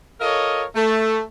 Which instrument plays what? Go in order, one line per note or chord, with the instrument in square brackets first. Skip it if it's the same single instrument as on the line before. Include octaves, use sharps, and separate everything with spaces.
[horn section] F4 A4 A#4 C#5 D#5
A3